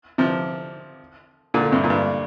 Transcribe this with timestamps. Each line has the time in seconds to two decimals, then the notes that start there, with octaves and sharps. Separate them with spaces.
0.18 C3 F3
1.54 A#2 D3
1.72 G2 C3
1.84 A#2
1.90 G2